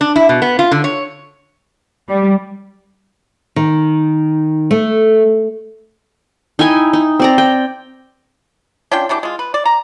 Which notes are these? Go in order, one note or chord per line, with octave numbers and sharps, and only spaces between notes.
D4
E4
B2
B3
F4
D3
C#5
G3
D#3
A3
D#4 E4 G5 G#5
D#4
C4 D5 A#5
G5
C#4 D4 F4 G5
B2 E3 D4 G4
G#3 F4
B4
D5
A#5